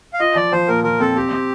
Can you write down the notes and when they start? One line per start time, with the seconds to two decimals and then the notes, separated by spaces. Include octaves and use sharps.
0.13 F5
0.20 F4 D#5
0.36 F3 D5
0.52 F3 C5
0.68 A#2 A#4
0.84 F3 A#4
1.00 C4 A4
1.16 C4 G4
1.32 C4